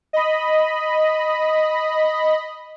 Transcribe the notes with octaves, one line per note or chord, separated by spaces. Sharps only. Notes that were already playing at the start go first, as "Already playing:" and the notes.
D#5 B5